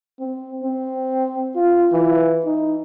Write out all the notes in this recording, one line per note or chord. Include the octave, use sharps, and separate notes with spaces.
C4
C4
F4
E3
D#4